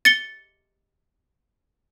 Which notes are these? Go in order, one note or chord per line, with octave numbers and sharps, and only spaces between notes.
A6 C#7 G7